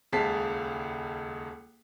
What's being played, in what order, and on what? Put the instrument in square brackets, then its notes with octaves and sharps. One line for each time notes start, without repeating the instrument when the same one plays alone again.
[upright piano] D#1 C#2 C#3 A5 B6 C7